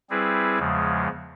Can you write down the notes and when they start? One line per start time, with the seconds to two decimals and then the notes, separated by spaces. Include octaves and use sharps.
0.10 G3 C4 E4 G#4 B4
0.58 E2 C#3 F3 G#3